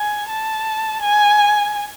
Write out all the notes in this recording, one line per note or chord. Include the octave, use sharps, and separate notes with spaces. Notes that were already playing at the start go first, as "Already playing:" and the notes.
Already playing: G#5
A5
G#5